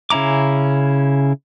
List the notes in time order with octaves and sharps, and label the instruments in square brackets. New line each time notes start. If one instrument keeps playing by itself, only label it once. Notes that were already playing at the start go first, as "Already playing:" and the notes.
[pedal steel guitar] C#3 C#4 E4 A#5 D6